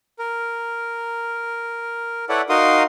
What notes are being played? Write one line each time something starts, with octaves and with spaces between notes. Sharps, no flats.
A#4
E4 A4 B4 C#5 D5 F#5
D#4 F#4 A#4 F5 C6 D#6